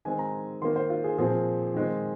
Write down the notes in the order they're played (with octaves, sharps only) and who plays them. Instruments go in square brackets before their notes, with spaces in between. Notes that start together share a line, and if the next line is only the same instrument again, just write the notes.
[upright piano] D#3 G#3 C4 G#5
A#5
D#3 A#3 C6
C5
F4
G#4
A#2 F3 C4 G#4
D#3 G#3 C4